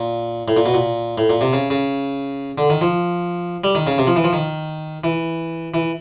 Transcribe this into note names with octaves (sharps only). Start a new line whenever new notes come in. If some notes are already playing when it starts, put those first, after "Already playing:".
Already playing: A#2
A2
A#2
B2
A#2
A2
A#2
C3
C#3
C#3
D3
D#3
F3
G3
D#3
C#3
C3
F3
E3
F3
D#3
E3
E3